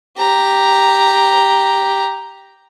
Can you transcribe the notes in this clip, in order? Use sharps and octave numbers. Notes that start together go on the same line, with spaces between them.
G4 A#5